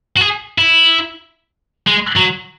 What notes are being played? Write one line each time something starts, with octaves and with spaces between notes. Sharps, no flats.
F#4
G#4
E4
G#3
F#3